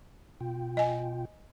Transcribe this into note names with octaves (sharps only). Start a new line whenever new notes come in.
B2 F4 G5
D#5 G#5